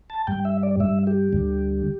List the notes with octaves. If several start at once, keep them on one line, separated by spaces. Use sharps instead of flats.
A5
G2 G3 G5
E5
D5
G2 G3 E5
G4
D2 D3 G3